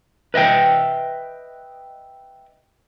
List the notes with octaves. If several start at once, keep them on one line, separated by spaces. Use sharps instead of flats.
B4 D#5 E5 G5